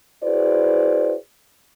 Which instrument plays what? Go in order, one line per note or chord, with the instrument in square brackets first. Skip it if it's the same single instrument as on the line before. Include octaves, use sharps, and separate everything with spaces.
[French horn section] E4 F#4 G#4 B4 C5 D5